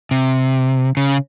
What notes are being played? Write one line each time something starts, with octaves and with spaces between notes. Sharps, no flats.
C3
C#3